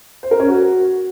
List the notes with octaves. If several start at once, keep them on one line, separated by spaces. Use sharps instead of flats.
C5
A#4
C#4
F#4